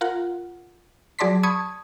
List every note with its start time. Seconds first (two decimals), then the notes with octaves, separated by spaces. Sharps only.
0.01 F4 A#4 F#5
1.19 F#3 G#4 D5 A5 C6 B6
1.43 A5 B5 C#6 D#6 G#6